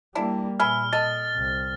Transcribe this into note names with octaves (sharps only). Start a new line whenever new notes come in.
G3 A#3 D4 E4
A#2 G#4 B4 E5 F6
A4 D#5 A6
C2